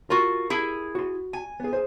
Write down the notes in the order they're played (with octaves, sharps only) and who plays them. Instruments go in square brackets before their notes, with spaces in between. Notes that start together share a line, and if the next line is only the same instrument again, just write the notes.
[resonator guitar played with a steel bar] F4 F#4 [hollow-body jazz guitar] A#4
[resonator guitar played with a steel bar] E4 G#4
[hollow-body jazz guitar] F#4 C6
[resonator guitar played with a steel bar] G#5
[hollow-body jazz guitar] B3 G#4
G#4 C5